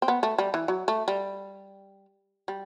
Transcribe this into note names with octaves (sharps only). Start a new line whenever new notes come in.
C4
B3
A3
G3
E3
F#3
A3
G3
G3